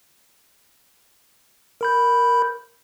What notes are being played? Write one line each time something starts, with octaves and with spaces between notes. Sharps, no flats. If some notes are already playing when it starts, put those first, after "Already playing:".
A#4 B5 G6